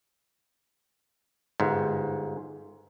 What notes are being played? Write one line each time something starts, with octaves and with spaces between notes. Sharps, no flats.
G1 G#2